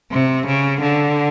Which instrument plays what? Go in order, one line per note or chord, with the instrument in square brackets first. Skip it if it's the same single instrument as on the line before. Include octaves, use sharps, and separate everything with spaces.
[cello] C3
C#3
D3